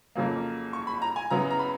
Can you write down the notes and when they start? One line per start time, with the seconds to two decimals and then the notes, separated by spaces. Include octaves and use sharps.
0.15 F2 C#3 F#3 A#3
0.73 C#6
0.87 B5
1.02 A#5
1.16 G#5
1.30 F#2 C#3 F#3 B3 A#5
1.51 A#5
1.59 B5